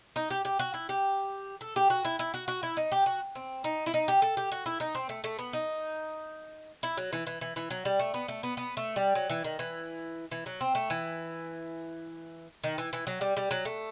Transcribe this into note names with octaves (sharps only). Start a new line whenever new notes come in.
D#4
G4
G4
F#4
E4
G4
A4
G4
F#4
E4
E4
F#4
F#4
E4
D#4
G4
F#4
C4
D#4
E4
D#4
G4
A4
G4
F#4
E4
D#4
C4
A3
A3
B3
D#4
E4
F#3
E3
E3
E3
E3
F#3
G3
A3
B3
A3
B3
B3
A3
G3
F#3
E3
D#3
E3
E3
F#3
C4
A3
E3
D#3
E3
E3
F#3
G3
G3
F#3
A3